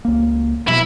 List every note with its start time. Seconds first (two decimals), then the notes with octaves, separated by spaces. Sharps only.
0.05 C#2 A#3
0.68 B2 F#3 E4